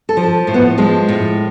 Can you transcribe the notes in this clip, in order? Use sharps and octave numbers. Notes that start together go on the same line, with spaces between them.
A4
F3
A2
B3
F3 G#3
A2